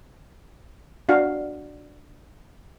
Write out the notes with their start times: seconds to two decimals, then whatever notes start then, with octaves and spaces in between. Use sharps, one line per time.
1.09 D4 F#4 F5